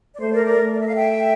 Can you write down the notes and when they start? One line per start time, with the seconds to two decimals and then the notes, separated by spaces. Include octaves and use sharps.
0.15 D5
0.20 A3 C5
0.32 A#4 D5
0.44 A#4 D5
0.58 A3
0.73 D5
0.79 E5
0.86 F5
0.94 E5 G5